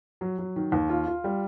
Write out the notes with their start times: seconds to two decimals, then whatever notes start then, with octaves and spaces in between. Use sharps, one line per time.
0.21 F#3
0.39 F#3
0.56 D#3
0.72 D#2
0.89 F4
1.07 F4
1.24 G3